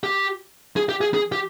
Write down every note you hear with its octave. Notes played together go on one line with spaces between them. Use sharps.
G4
G#4
G4
G#4
G#4
G4